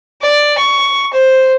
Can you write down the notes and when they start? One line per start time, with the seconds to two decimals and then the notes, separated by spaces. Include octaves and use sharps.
0.21 D5
0.58 C#6
1.13 C5